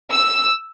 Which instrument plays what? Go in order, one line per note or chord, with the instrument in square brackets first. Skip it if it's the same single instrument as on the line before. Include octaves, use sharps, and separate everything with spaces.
[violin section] E6